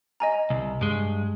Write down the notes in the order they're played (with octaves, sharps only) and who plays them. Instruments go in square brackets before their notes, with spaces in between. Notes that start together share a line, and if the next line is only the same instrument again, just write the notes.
[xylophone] D#5 G#5 A#5
[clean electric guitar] C2
G2 G#3